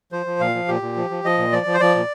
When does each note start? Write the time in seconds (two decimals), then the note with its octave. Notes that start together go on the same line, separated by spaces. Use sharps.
0.12 F3 C5
0.26 F3
0.40 A#2 F5
0.55 F3
0.68 A#2 G4
0.82 A#2
0.96 F3
1.10 F3
1.24 F3 D#5
1.38 A#2
1.52 F3 D5
1.66 F3
1.74 C5
1.80 F3 D5
1.95 A#2